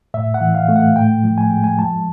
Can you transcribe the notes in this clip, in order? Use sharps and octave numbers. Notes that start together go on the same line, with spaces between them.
A2 E5
F#5
E3
F5
A3
F#5
A2 G5
F3
G#5
G#3 G5
G#5
F3 A5